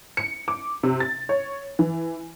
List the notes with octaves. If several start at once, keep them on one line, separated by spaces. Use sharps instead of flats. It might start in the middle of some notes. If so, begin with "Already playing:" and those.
C#7
D6
C3
A6
C#5
E3